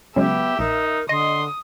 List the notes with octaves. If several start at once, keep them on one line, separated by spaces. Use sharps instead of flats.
C#3 F#3 G#3 B3 G4 E5
A#1 D#4 A#4
D3 D#5 C6 D#6